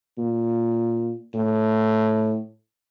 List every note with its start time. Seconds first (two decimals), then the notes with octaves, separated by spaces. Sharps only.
0.18 A#2
1.34 A2